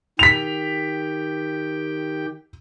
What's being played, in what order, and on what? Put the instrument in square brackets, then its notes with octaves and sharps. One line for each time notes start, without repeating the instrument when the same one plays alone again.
[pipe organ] D#3 G4 G5 [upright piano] B6 F7